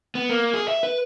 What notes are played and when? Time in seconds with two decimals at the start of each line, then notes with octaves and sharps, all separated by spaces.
0.15 B3
0.29 A#3
0.54 G#4
0.68 E5
0.83 B4